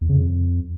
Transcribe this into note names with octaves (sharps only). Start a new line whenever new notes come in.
E2
C#3
F2